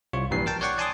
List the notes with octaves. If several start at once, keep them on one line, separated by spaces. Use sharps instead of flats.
C2 F4 C#5 C#6
A#1 G2 A#2 E3 G3 C7
A#4 G5 A5
C#5 D5 F#5 G5 C#6
D5 G#5 A5 C6 D6 D#6